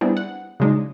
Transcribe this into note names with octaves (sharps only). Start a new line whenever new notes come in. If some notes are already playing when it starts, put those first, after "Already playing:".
G3 B3 C4 D4 E4 G#4
F#5
C#3 F#3 G#3 D4 D#4